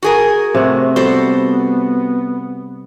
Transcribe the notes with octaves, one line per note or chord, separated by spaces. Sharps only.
F#4 G#4 A#4
C3 A3 C#5 F#5
G3 B3 F#4 A4 C5